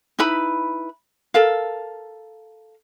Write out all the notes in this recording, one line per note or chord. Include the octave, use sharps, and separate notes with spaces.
D#4 E4 B4 B5
A4 A#4 F5